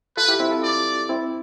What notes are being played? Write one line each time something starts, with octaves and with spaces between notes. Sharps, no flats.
F4 A4 B4
E4 G4
C4 E4
F4 A4
D5
C4 E4